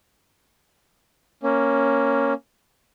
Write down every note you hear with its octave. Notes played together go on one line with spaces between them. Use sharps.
A#3 C#4